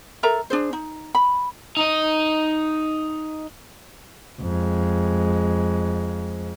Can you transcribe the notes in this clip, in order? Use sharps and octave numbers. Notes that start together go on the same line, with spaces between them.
A4 A#4 E5 A#5
D4 G#4 C5
D#4
B5
D#4 D#5
F2 G#3